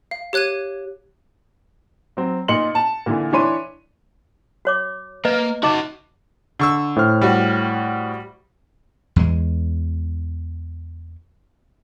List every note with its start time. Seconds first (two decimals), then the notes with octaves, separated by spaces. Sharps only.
0.11 F5
0.33 G4 C#5 F#6 G#6 D#7
2.17 F#3 C4
2.48 A#2 D#4 C6 C#7 F#7
2.75 A5
3.06 A#2 D3 E3
3.32 E3 D4 C#5 B5 C6 D#7
4.65 F#4 C#5 D6
5.25 A#3 B4 D#5
5.63 D#4 F#4 D#5 A5 D6
6.60 D3 C#6 E6
6.96 A2 C5 F6
7.21 G3 F#4
9.16 E2 G#3